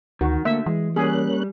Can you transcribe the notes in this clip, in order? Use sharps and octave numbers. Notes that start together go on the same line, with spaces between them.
D2 D#3 F#4
D3 A3 A#3 E5
E3 G#3
G3 A#3 C#4 G#4 F#6